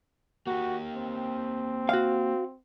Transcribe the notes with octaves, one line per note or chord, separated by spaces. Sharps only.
A#3 F#4 G4
C4
F#4 F5